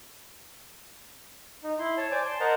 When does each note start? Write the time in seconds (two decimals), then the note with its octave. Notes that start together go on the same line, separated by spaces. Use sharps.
1.63 D#4
1.79 E4 C6
1.98 C#5 A5
2.12 C5 D5 G#5 D6
2.25 A5 C6
2.40 A#4 C5 D#5 F#5 A5 A#5